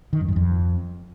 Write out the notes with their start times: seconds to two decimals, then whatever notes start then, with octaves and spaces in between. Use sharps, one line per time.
0.13 D#3
0.21 F#2
0.28 G2
0.36 F2